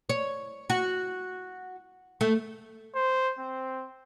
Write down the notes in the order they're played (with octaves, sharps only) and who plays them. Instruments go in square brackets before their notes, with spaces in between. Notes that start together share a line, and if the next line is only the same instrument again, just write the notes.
[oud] C#5
F#4
A3
[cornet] C5
C4